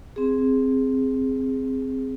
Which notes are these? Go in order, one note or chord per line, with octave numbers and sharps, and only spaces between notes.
C4 G#4